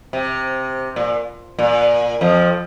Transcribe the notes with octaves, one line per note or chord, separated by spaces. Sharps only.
C3
A#2
A#2
F2 F3